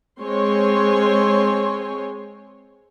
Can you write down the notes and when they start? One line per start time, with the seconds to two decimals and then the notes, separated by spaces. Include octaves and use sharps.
0.21 G#3 C4 C#5 G#5 C6